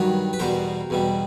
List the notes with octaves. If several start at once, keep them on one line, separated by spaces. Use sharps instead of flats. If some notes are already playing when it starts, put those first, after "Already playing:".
Already playing: G2 D#3 F#3 B4 C#5
B4
E2 B2 G3 A#4 C5
E2 B2 G3